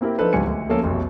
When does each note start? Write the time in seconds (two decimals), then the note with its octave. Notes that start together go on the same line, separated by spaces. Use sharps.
0.01 A#3 C4 E4 G4 A#4
0.18 F3 D4 D#4 A4 B4 C5
0.33 C#2 G#2 G4 G#5 C#7
0.47 D2
0.69 F3 A3 A#3 C#4 A4
0.83 F1 B1 E2 B2